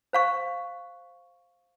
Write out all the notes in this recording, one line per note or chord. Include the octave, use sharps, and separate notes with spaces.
C5 F5 C#6